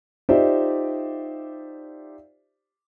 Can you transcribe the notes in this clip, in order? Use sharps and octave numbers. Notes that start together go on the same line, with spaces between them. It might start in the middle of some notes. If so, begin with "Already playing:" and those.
D#4 F4 G4 C5 D5 E5